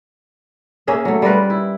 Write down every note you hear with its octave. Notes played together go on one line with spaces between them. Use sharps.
A#3 C#4 G#4 E5
F#3 A3
G3 F4 A#4 B4
E4